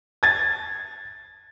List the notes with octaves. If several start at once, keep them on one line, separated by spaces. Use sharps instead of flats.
G#6 A6